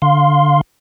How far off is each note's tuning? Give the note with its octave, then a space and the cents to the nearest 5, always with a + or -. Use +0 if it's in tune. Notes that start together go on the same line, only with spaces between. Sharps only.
D3 +0 F5 +10 C6 +0